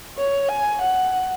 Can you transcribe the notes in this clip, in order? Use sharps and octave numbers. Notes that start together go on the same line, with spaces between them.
C#5
G#5
F#5